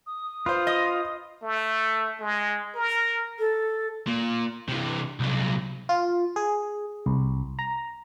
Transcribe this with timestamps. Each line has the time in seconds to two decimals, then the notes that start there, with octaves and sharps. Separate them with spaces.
0.07 D#6
0.46 F4 B4 C5
0.67 D#5
1.42 A3
2.20 G#3
2.75 A#4
3.39 A4
4.07 A#2
4.68 C3 E3
5.20 C2 F#3
5.89 F4
6.36 G#4
7.06 C2
7.59 A#5